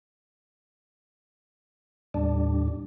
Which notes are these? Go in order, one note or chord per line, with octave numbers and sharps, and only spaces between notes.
D#2 A2 G3 D4